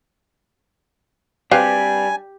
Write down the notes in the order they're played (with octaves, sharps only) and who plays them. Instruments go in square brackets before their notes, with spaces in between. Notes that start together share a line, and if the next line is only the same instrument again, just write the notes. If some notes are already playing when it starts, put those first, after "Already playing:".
[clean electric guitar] G3 D4 [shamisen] C4 B4 F5 [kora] G4 [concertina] G#5